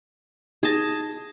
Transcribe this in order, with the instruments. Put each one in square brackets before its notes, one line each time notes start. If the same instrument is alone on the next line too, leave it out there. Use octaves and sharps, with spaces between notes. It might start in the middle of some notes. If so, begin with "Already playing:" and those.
[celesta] D#4 D#6 A#6 [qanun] G#4 A5